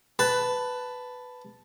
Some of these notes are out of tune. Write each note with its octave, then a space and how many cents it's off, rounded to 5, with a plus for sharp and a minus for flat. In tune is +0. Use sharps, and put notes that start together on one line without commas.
B4 +10 A5 +0